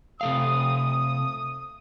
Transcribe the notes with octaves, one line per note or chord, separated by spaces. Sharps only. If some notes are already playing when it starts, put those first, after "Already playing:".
C3 A3 F5 D#6